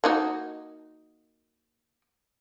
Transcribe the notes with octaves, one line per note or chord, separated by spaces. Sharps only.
A#3 D#4 F#4